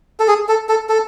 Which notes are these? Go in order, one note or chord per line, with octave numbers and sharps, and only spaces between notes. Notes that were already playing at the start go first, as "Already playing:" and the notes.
A4
G#4
A4
A4
A4